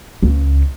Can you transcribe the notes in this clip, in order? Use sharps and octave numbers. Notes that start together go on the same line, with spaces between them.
C#2